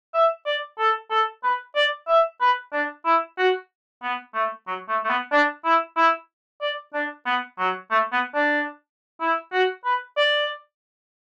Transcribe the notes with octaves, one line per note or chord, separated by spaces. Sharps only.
E5
D5
A4
A4
B4
D5
E5
B4
D4
E4
F#4
B3
A3
F#3
A3
A3
B3
D4
E4
E4
D5
D4
B3
F#3
A3
B3
D4
E4
F#4
B4
D5